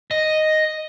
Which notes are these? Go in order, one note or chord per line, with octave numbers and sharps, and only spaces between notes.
D#5